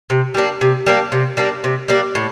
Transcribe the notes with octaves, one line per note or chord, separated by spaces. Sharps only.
C3
G3 A#3 D4
C3
G3 A#3 D4
C3
G3 A#3 D4
C3
G3 A#3 D4
A2